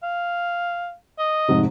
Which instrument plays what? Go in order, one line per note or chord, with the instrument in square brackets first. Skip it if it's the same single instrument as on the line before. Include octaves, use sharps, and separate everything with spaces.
[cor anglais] F5
D#5
[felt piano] F1 G#2 C3